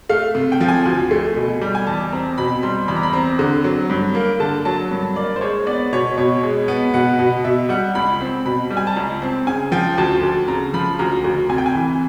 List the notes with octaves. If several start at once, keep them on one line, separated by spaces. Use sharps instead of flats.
A3 F5
C3
G5
F3
G#5
D2
A3
B2
G3
G#5
E2 A5
C4 A#5
B2 B5
G3 C6
E2 B5
A#5
B5
C4 A#5
D3
F#3
G2
A#3
D3 A5
F#3 A5
G2
A#3 D5
C5
G#3 C#5
B3 D5
B2 C#5
B2 C#5
G#3
B3
B2 F#5
B2
B2 E5
G3 F#5
C#2 B5
C4
B2 B5
G3
G#5
A5
C#2 A#5
C4
C#3 G#5
F3 G5
D2 A5
D2
C#3 A#5
F3 B5
D2 A#5
D2
C3 G#5
G5
G#5
E3